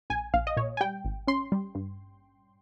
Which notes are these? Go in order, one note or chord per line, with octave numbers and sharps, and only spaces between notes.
A#1 G#5
A#1 F5
D#5
A#2 C#5
G#5
G3 G5
G#1
C#4 C6
G3
G2